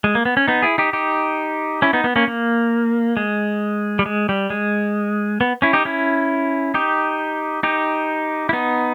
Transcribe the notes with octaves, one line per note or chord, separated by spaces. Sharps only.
G#3
A#3
B3
C#4
B3 D#4
E4 G#4
D#4 G4
D#4 G4
C#4 E4
B3 D#4
B3
A#3 C#4
A#3
G#3
G3
G#3
G3
G#3
B3
C#4 E4
D#4 G4
C#4 E4
D#4 G4
D#4 G4
E4
B3 D#4